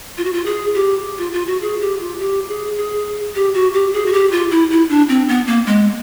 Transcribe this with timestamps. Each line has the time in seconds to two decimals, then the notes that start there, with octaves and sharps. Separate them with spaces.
0.18 F4
0.25 F#4
0.33 F4
0.46 G#4
0.74 G4
1.18 F4
1.33 F4
1.47 F#4
1.62 G#4
1.81 G4
2.00 F4
2.19 G4
2.49 G#4
2.77 G#4
3.35 G4
3.54 F#4
3.74 G4
3.93 G#4
4.06 F#4
4.13 G4
4.31 F4
4.51 E4
4.71 E4
4.89 D4
5.09 C4
5.28 B3
5.47 A#3
5.67 G#3